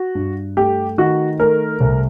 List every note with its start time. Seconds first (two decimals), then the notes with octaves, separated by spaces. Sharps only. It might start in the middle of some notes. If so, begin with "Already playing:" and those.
Already playing: F#4
0.15 G2
0.57 A3 G4
0.98 D#3 F#4
1.40 A3 A#4
1.80 C2